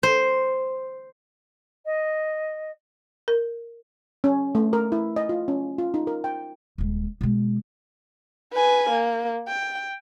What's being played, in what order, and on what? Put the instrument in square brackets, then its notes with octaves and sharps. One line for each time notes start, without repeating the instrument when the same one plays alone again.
[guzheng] C5
[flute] D#5
[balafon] A#4
[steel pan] C#4
A3
A#4
E4
D#5
F4
C#4
F4
D#4
A#4
G5
[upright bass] D#1 G#3
B2 G#3
[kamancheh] B4 G#5
A#3
G5